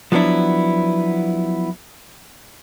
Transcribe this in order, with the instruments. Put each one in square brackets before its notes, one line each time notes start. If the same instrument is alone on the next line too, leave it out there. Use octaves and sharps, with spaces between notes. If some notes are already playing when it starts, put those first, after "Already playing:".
[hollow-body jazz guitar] F3 F#3 B3 D4 E4